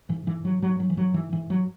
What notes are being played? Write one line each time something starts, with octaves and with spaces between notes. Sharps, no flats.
G#2 E3
G#2 E3
G#2 F#3
G#2 F#3
G#2 F#3
E3
G#2 F#3
G#2 E3
G#2 E3
G#2 F#3